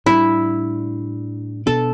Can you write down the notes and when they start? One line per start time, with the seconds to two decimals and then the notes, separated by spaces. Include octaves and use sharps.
0.06 A2 G3 D4 E4
1.66 B2 B3 D4 A4